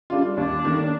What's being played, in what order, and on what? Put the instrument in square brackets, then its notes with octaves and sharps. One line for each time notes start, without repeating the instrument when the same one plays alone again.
[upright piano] G3 D4 F4
[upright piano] D#2 [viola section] D4
[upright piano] D#3 A#3